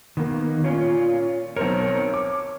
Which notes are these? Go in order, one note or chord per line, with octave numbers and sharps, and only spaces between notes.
D#3 A#3 B3
A#2 C#4 F4 C#5
B1 C4 A#4 C#5
D6